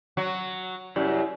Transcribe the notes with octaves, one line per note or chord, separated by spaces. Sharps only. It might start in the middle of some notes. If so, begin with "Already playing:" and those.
F#3 F#4
F#2 E4 G4 D5